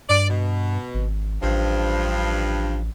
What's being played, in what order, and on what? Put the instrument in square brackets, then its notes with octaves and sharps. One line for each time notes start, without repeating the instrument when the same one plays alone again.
[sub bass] G2 [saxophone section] D5
[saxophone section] B2
[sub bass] G#1
[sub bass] A1 [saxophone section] G2 F3